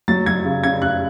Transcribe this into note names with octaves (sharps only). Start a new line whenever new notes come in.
F#3 A6
F#3 G#6
C#3
C#3 G#6
C#3 F#6